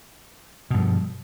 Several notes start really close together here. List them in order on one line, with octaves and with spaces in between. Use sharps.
B2 G2 F3